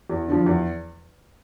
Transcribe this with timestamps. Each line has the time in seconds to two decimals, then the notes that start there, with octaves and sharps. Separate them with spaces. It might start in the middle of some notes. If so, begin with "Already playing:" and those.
0.10 E2
0.28 D3 F3
0.46 E2